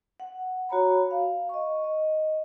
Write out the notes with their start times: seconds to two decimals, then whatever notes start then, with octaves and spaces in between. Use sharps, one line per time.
0.20 F#5
0.69 F#4 C#5 A#5 B5
1.11 F5
1.49 D#5 C#6
1.84 D#5